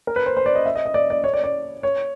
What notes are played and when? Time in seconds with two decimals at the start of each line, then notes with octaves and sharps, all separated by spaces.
0.07 A#4
0.16 B4
0.26 C5
0.37 C5
0.46 D5
0.55 D#5
0.66 E5
0.75 D#5
0.86 D#5
0.94 D5
1.10 D5
1.24 C#5
1.34 D5
1.44 D5
1.83 C#5